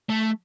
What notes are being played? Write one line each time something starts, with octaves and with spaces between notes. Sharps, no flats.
A3